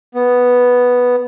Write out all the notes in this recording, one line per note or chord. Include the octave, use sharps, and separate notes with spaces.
B3